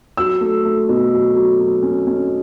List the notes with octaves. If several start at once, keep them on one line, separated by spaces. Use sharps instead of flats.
F#3 E6
A3
A3
B2
F#3
F#3
F#3
C#4
C#4